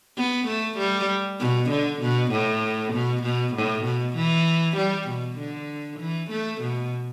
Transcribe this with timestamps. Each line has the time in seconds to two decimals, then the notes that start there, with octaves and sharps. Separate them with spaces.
0.17 B3
0.48 A3
0.78 G3
1.40 B2
1.70 D3
2.02 B2
2.32 A2
2.94 B2
3.23 B2
3.54 A2
3.85 B2
4.16 E3
4.77 G3
5.08 B2
5.38 D3
6.00 E3
6.31 A3
6.62 B2